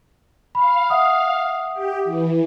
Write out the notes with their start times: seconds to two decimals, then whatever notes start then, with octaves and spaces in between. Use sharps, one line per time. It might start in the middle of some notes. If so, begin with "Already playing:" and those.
0.55 F5 B5
0.90 E5 F#5 D#6
1.74 G4
2.05 E3